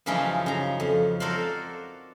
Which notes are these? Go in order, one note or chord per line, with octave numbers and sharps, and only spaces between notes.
F#2 C#3 E3 F3 C#4 D#4
C#3 A#5
F2
F#4 A4 A#4 C5 D5 F5